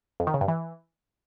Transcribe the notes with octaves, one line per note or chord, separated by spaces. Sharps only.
F2
D#3
C#3
G2
E3